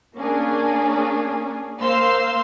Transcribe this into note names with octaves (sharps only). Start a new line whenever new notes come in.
A#3 C#4 D4 G#4
A#3 C5 F5 C6 E6